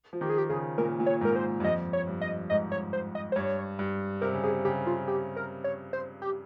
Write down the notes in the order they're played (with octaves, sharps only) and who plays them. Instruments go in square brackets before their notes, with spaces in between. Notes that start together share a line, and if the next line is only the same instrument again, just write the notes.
[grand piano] F3
[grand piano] D#3 [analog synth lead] G4
[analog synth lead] G#4
G4
[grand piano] C#3 [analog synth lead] G#4
[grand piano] A#2 [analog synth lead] A#4
[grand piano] A#2
[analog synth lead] C#5
[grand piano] G#2
[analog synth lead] A#4
C5
[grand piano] G2
[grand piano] F2 [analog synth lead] D#5
[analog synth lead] C#5
[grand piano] G2
[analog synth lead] D#5
[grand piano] G#2 [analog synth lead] D#5
[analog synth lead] C#5
C5
D#5
C5
[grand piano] G2 [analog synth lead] C#5
[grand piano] G2
[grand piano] C3 [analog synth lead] A#4
[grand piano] C#3
[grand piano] C3 [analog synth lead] G#4
[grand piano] C#3 [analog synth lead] G4
[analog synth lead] F4
G4
A#4
C#5
C5
G4